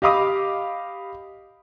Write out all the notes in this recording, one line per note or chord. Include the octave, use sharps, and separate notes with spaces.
G4 D#5 F5 B5 D6 D#6